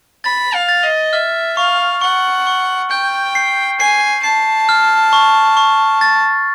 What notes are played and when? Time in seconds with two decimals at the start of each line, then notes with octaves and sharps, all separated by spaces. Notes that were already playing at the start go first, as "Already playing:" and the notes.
0.24 B5 A6
0.54 F5
0.69 A6
0.84 D#5
1.13 E5 F6
1.57 F5 C#6
2.01 F#5 C#6
2.47 C#6
2.90 G5 G6
3.35 C7
3.79 G#5 C7
4.23 A5 C7
4.69 F6
5.13 C#6
5.57 C#6
6.01 A6